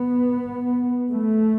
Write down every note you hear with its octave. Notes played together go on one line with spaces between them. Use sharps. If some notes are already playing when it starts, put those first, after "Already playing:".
Already playing: B3
A3